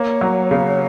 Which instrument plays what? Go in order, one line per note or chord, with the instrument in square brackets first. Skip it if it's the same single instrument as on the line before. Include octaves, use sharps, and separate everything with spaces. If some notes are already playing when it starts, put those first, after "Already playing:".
Already playing: [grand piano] A#3 [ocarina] C#5
[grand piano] F#3
C#3